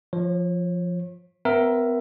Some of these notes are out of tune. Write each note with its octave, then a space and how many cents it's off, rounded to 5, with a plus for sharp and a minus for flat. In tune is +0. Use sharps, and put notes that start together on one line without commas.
F3 +0 C#5 -35
B3 +45 A#4 +15 E5 +15